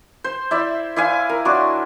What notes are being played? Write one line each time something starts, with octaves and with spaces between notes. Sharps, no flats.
C5
E4 D5 E5
E4 D5 F5 G#5
A#4
F#3 D4 C6 D6